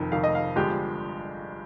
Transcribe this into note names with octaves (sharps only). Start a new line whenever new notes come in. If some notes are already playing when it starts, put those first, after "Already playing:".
Already playing: F1 F2 D#3
F1 F2 D#3 F5
D#5
F5
G1 G2 D3 F3 G#3 G4